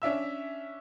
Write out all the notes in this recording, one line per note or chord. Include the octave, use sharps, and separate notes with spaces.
C#4 D4 E5 E6